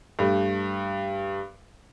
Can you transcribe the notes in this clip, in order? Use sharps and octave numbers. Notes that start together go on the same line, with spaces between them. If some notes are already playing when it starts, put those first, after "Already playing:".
G2 A3